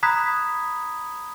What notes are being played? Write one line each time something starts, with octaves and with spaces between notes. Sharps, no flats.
A#5 B5 D#6 F#6 G#6 B6